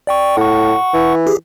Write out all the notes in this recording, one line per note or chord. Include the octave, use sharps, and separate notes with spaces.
D5 G5 C#6
A2 F#5 C#6
E3
G4 G#4